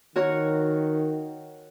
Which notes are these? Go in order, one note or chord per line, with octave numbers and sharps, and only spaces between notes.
D#3 F#4 A#4 C#5